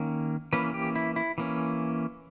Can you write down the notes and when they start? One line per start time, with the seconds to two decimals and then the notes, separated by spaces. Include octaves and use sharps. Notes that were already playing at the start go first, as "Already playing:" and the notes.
Already playing: D#3 A#3 C#4
0.53 E3 A#3 C#4 B4
0.74 G4
0.96 E4
1.16 E4
1.38 E3 A#3 C#4